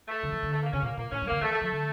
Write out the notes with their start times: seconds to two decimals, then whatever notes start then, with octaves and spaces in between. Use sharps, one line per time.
0.08 A3
0.23 D3
0.32 E3
0.43 D3
0.53 A3
0.63 A#3
0.73 C#3 C#4
0.82 A#2 A#3
0.97 A#2 A#3
1.12 A2 C#4
1.22 G2
1.27 D3 A#3
1.41 E3 A3
1.51 A3
1.61 F3 A3
1.72 D3